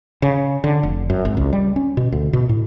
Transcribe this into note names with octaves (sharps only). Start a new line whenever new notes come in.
C#3
D3
F1
F#2
G#1
C#2
G3
C#4
B2
D2
B2
A2